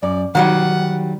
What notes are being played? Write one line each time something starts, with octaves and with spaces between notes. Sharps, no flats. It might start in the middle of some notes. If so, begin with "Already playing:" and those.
F#2 D5
D#3 F#3 G3 F#5